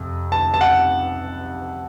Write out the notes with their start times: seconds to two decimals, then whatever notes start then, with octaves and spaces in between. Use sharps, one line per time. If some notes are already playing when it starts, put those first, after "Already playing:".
Already playing: F2 C3
0.32 A5
0.54 A5
0.61 F#5